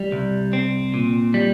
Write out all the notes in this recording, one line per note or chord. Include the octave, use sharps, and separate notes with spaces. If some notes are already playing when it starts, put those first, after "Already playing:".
Already playing: G3
C2
C4
A#2
G3